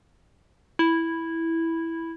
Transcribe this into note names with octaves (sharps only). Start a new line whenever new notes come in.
E4